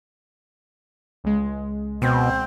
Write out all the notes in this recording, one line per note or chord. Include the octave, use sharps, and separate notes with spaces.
C#2 G#3
B2 C4